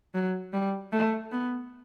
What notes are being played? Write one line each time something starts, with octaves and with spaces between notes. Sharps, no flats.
F#3
G3
A3
B3